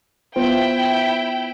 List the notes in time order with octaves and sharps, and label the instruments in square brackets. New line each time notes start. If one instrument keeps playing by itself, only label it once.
[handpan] B3 F4 C5 [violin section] E4 G5